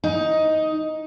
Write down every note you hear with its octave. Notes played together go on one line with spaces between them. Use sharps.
D#4